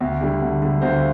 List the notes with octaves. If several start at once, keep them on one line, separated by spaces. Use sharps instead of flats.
D2
D3 G3
D2
D3 G3
D2 C5 F5